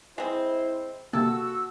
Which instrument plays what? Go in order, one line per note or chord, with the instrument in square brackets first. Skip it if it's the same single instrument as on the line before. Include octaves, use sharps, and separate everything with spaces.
[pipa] G#3 C4 [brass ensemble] E4 C5
[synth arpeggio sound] C3 A#3 [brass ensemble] F#4 [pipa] A4 [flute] E6